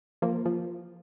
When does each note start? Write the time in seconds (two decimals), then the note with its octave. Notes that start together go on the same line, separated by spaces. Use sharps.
0.22 F3 A#3
0.46 F3